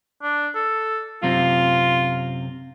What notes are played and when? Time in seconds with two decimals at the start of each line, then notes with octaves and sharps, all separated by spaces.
0.22 D4
0.55 A4
1.23 F#2 C3 C4 F4